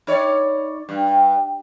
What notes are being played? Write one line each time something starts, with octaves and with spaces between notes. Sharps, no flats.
D#4 C#5 D5
G2